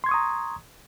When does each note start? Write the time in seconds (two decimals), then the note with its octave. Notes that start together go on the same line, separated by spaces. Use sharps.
0.04 C6
0.06 G#6
0.09 C#6
0.11 D#6
0.14 A#5